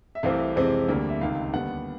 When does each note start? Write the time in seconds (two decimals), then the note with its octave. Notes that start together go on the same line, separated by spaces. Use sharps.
0.15 E5
0.23 C2 C3 E3 A3 C4 F5
0.56 F2 C3 E3 G#3 C4
0.88 D2 D3 G3 A#3
1.09 E5
1.21 C#2 C3 D#3 F5
1.53 D#2 D3 G3 B3 F#5